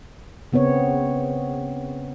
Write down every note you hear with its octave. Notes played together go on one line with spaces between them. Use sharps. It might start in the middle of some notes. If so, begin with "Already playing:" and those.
C#3 B3 C4 C#5